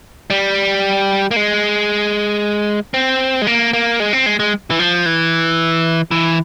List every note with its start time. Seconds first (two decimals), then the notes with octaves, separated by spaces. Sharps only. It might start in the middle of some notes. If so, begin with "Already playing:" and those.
0.30 G3
1.31 A#3
1.36 G#3
2.94 C4
3.42 G#3
3.47 A#3
3.73 A#3
4.00 G#3
4.13 C4
4.26 G#3
4.40 G#3
4.70 E3
4.79 F3
5.06 E3
6.11 E3